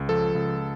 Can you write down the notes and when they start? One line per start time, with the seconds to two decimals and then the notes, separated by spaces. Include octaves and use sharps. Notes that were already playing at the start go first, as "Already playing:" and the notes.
Already playing: C#2
0.09 F3 A4
0.35 C#2